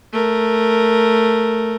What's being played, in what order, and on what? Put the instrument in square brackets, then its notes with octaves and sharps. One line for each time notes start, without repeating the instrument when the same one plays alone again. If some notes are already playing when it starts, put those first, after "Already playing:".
[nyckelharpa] A3 A#4